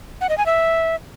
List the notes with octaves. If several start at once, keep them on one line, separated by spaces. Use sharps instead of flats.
F#5
D#5
G#5
E5